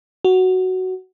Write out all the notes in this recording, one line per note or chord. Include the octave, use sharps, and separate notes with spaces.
F#4